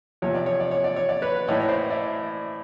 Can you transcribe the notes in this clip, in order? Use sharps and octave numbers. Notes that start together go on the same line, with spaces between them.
E2 C3 F3 C#5
D5
C#5
D5
C#5
D5
C#5
D5
B4 C#5
A2 E3 C#5 D#5
C#5
C5 D5
D5 E5